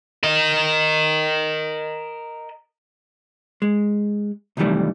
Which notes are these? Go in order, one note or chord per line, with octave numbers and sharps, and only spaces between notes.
A#4 D#5
G#3
C2 F#2 D#3 E3 G3 A3